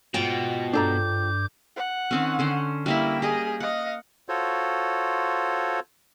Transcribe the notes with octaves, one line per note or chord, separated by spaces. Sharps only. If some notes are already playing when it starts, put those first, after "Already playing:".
G#2 B2 F4 G5
G2 D4 A4 A#5 D6 G6
F#5
D#3 C4 C#4
D3 C#4 C5
G3 A#3 E4 E5 G5
G4 G#4 D#5
D#5 F5 F#5
F4 F#4 A4 C5 C#5